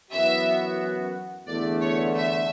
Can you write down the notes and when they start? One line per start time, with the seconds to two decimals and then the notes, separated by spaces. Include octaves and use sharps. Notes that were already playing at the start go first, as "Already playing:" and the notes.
0.11 F#2 E3 B3 F#4 E5
1.47 E2 D3 A3 D5
1.81 C#5
2.15 E5